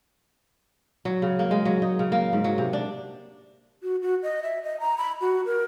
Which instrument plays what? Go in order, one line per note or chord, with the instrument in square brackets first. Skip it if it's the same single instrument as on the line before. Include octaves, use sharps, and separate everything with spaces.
[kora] F#3
C#3
A#3
G#3
F#3
D#4
C#3
A#3
G#2
F#3
C3
D4
[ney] F#4
F#4
D#5
E5
D#5
A#5
B5
F#4
A#4